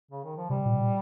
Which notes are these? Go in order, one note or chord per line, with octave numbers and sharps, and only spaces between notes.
C#3
D#3
F3
C3 G3
A#2
C3
A#2